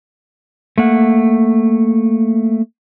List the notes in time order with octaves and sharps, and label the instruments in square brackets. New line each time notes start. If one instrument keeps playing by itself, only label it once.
[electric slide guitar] A3 A#3 F#5